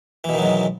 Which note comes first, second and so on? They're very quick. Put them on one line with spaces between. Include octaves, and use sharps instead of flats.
E3 B2 D#3 F#3 G#2